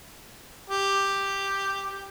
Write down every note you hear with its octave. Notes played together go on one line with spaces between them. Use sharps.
G4